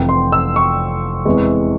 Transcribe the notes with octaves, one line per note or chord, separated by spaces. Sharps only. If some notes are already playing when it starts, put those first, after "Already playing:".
Already playing: F1 F2 E3 G5
C6
E6
C#6
E2 C3 E3 G#3